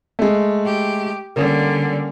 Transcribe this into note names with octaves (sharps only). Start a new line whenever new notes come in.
G#3 A3
G4
D3 G3 A#3 C#4